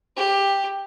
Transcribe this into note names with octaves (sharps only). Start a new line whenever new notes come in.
G4